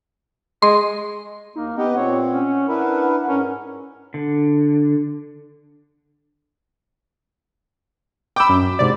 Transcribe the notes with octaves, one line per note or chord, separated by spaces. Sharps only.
G#3 C6
D#2 A#3 D#4
B3 G4 B4 D#5 F#5
A#2 C4 C#5 F#5
C#4
D4 E4 A#4 B4
G#2 C#4 A#4
D3
G5 B5 D6 E6
F#2
G#2 C3 D5